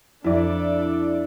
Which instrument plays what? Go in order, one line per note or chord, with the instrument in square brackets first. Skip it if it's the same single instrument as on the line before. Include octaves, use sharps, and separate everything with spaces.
[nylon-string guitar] F2 [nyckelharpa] D4 A4 [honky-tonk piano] E4 D5